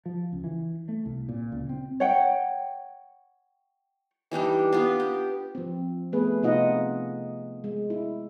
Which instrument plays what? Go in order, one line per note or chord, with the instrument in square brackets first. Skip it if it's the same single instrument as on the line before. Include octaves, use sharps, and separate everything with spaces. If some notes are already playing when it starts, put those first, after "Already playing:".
[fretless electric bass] F3
C#2
E3
A3
C2
A#2
C#2
C4
[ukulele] C#5 F#5 G5
[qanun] E3 G3 D4 D#4
B3 D4 F4
G4
[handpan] F3 C4
A3 B3 G#4 B4
C3 D#4 F4 D#5 F#5
G#3
E4